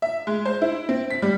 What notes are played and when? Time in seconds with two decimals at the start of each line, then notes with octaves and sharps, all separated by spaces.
0.02 E5
0.27 G#3
0.45 C5
0.62 E4
0.89 C4
1.10 B6
1.22 G3